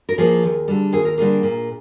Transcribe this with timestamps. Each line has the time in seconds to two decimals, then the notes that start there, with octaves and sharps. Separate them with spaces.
0.09 A#4
0.18 F3 A#3 G#4
0.43 D#2
0.68 D3 G3
0.92 D#2 G#4
1.05 A#4
1.18 D3 G3 A#3 G#4
1.43 A#2